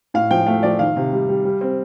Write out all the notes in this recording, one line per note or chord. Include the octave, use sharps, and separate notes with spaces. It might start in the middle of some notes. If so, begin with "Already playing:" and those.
A2 F5
F3 G5
A3 F5
F3 D5
D#3 F5
C3
G3
G3
G3
C4